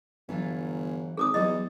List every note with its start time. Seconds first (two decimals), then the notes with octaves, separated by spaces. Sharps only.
0.29 G1 E3 F#3 F4
1.17 G#1 G#4 D6 D#6
1.34 E2 F#3 G3 D#4 D#5